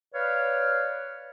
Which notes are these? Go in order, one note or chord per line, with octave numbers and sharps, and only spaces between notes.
B4 C#5 D5 F5